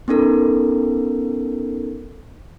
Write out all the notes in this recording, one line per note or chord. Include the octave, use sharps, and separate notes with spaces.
B3 C#4 D#4 A4 A#4